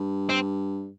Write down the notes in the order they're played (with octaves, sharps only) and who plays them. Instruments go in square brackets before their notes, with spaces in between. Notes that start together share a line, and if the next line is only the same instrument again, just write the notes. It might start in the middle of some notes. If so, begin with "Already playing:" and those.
Already playing: [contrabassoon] G2
[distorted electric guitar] C4